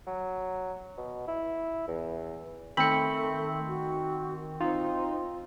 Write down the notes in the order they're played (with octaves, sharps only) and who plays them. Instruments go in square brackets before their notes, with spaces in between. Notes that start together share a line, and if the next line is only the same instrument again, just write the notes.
[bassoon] F#3
B2
E4
E2
[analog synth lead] D#3 [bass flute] A3 [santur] C4 [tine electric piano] B5 C#7
[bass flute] F#4
[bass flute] C4 [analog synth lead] D#4 [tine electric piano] F4